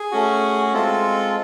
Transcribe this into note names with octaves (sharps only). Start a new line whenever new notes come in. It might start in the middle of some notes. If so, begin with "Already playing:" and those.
Already playing: G#4
A3 C#4 F#4
G#3 C4 F4 A4